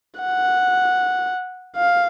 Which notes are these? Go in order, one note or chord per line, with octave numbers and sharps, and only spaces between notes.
F#5
F5